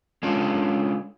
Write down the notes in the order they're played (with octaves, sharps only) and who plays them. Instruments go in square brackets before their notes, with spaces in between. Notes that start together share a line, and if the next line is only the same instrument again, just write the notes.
[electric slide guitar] G#3 C#4 D4 F4 A4